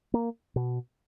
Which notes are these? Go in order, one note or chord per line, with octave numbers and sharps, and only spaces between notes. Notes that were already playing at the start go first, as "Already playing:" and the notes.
A#3
B2